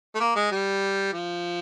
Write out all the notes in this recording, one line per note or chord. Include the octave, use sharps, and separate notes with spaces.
A3
A#3
G#3
G3
F3